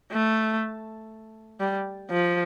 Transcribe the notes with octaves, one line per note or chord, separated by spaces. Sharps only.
A3
G3
F3